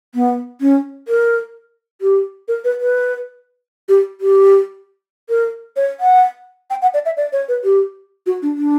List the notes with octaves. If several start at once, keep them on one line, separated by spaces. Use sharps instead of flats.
B3
C#4
A#4
G4
A#4
B4
B4
G4
G4
A#4
C#5
F#5
G5
F#5
D5
E5
D5
C#5
B4
G4
F#4
D4
D4